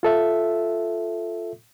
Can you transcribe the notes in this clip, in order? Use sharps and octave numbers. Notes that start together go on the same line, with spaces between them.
F4 A4 E5